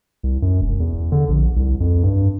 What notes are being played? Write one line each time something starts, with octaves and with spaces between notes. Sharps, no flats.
C2
F#2
E1
E2
D3
A#1
C2
F2
G2